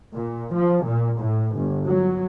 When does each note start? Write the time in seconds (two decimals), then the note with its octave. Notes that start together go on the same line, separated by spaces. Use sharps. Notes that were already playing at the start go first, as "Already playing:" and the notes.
0.15 A#2
0.56 F3
0.86 A#2
1.20 A2
1.56 G1
1.87 F#3